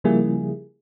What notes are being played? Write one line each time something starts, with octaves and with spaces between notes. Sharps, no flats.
C#3 F3 G3 A#3 E4 G#4